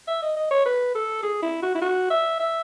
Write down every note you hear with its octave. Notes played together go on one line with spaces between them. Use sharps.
E5
D#5
D#5
C#5
B4
A4
G#4
E4
F#4
E4
F#4
E5
E5